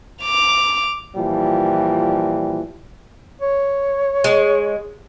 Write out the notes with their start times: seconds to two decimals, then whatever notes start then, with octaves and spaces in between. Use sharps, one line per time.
0.23 D6 F7
1.15 A#2 E3 F3 G3
3.42 C#5
4.24 G#3